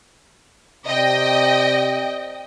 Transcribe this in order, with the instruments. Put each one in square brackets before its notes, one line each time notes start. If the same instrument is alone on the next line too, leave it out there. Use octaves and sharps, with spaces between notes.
[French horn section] C3 D5 [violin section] D#5 G5